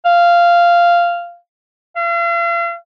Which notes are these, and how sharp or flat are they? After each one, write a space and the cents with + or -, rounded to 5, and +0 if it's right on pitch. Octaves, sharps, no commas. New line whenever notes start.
F5 -10
F5 -40